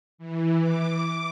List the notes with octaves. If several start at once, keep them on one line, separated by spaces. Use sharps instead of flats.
E3
D6